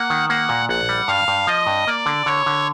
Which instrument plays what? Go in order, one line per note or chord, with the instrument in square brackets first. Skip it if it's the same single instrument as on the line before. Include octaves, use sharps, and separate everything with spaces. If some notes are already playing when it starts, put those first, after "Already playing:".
Already playing: [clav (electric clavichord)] A#3 [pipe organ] F#5
[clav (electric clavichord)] D#3
[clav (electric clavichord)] A#3 [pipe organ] F#5
[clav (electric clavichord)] A#2
[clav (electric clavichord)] A#1 [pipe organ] F#5
[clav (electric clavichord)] G3
[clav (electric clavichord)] G2 [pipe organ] F5
[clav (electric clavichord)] G2
[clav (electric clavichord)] F3 [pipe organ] D#5
[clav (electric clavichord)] G2
[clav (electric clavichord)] A#3 [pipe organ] D5
[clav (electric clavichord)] D3
[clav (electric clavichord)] D3 [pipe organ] C#5
[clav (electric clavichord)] D3